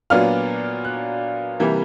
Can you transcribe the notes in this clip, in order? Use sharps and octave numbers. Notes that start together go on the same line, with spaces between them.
A#2 F#3 B3 D4 F4 F6
F#6
C3 E3 G3 A#3